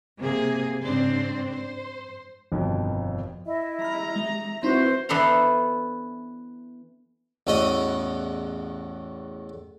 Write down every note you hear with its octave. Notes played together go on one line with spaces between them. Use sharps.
C3 A#3 G#4
G#2 C#3 C4 D4 C5
C5
G1 F2 B2 D#3
E4 D#5 E5
A#5 B5 F6
G#3 E5
C4 D#4 E4 F#4 B4 C5 E5
E3 B3 D4 A4 C5 A#5
A1 E2 A2 F#4 D#5